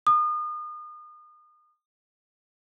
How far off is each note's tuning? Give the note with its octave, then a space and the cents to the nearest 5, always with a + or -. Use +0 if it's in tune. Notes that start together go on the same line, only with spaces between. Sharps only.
D#6 -35